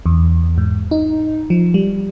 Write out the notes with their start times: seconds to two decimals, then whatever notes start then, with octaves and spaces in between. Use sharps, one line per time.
0.06 E2
0.58 G#2
0.91 D#4
1.50 F3
1.74 G3